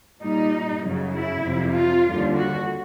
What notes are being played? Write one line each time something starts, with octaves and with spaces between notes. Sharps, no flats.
A#2 G3 D#4
F#2 C#3 F#3
E4
F2 C3 F3
F4
D#2 D3 G3
F#4